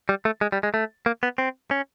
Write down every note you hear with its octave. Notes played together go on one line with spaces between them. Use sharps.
G3
A3
G#3
G3
G#3
A3
A#3
B3
C4
C#4